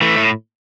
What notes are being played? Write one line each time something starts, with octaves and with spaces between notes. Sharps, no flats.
E3 A3
A2